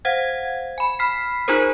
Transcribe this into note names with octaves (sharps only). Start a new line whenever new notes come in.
C5 F5 F#5 G#6
G#5 B5
B5 F6 B6 C7
D#4 F4 G#4 A#4 C5